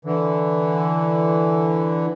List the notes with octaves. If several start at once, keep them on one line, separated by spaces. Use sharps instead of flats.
D3 E3